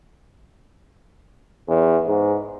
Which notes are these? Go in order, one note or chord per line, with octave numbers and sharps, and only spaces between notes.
E2
G#2